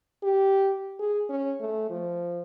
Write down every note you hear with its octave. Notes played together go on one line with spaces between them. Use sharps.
G4
G#4
C#4
A3
F3